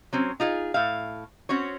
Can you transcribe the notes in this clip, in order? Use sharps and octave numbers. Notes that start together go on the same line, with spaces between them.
F#3 C4 C#4
D#4 F4 G#4
A2 E5 F5
C4 C#4 F#4 C#5